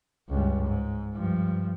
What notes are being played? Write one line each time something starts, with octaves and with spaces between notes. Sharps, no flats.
C#2 G2
G#2
G2 F3